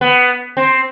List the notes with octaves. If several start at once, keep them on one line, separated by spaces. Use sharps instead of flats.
B3
C4